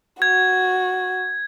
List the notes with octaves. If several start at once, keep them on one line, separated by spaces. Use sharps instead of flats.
F#4 G#6